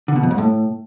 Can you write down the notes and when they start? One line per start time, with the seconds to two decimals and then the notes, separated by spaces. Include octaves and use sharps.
0.08 D3
0.16 B2
0.23 F2
0.31 G#2
0.38 A2